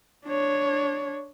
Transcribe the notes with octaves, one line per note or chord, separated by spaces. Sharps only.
D4 C#5